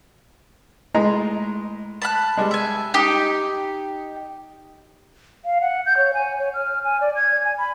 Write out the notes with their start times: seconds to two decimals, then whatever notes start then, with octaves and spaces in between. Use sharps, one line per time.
0.95 A2 G#3 A#5
2.02 A5 B5 F#6
2.37 G3 G#3
2.51 E5 G#5
2.94 D#4 G4
5.45 F5
5.61 F#5
5.86 G6
5.97 C#5
6.14 G#5
6.39 C#5
6.54 F6
6.84 G#5
7.01 D5
7.16 G#6
7.45 G#5
7.58 B5